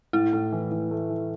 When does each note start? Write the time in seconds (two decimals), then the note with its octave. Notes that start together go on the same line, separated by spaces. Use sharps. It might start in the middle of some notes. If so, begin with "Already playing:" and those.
0.13 A2 E4
0.33 A2
0.52 E3
0.72 E3
0.91 A3
1.10 E3